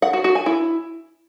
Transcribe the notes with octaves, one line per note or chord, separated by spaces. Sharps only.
F#5
F#4
F#4
G#5
E4